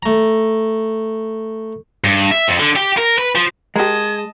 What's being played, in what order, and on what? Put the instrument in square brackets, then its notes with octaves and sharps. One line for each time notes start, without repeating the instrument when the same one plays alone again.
[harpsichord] A3 A#5
[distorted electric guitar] G2
E5
F2
D3
G4
A#4
B4
F3
[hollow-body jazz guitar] G#3 [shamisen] G4 A#4 [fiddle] D#5 A5 [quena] G#6